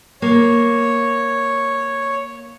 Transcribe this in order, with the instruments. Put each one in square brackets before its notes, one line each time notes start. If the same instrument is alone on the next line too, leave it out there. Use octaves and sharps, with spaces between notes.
[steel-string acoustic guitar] A#3 [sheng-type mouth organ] C#5